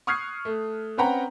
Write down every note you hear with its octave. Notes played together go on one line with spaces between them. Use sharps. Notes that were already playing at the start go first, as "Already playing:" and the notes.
C#6 D#6 F6 F#6 G#6 C7
A3
C4 C#4 B4 F#5 G5 A#5